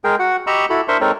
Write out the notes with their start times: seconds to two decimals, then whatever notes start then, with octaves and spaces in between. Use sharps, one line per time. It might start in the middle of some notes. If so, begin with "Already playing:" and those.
0.04 G#3 G#4 A#4 G5
0.19 F#4 F#5
0.47 G4 D#5 A#5 B5 C#6 E6
0.70 E4 F#4 A4 B5
0.88 D4 A#4 C5 E5 C6 C#6
1.01 G#3 C4 D#4 A4 A#4 C#5